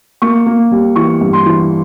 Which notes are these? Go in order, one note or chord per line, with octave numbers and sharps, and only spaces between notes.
A#3 C#6
A#3
G3
E3 C#6
G2
C6
E3